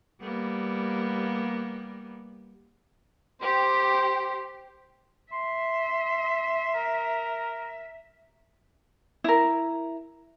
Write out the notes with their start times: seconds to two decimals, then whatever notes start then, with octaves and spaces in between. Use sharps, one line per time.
0.22 G3 A#3 B3
3.42 G4 C5
5.32 E5 C6
6.74 A#4
9.24 E4 A#4